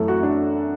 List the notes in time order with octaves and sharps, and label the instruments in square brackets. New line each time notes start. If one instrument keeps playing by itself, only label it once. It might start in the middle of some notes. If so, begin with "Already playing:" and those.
Already playing: [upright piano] F#2 E3 A3 A4
F#4
D4